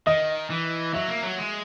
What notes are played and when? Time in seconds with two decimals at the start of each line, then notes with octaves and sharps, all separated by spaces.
0.07 D#3 D#5
0.50 E3
0.94 F#3 E5
1.08 A#3
1.23 F#3
1.38 G#3